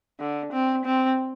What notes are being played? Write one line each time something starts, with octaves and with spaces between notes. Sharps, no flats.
D3
C4
C4